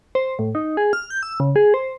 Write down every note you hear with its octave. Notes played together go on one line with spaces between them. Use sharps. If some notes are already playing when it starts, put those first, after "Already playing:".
C5
A2
D#4
G#4
F6
G6
E6
C#3
G#4
C5